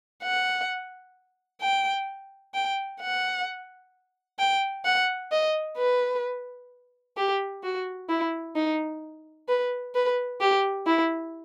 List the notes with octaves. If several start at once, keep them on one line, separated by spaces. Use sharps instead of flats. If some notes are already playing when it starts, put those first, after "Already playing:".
F#5
G5
G5
F#5
G5
F#5
D#5
B4
G4
F#4
E4
D#4
B4
B4
G4
E4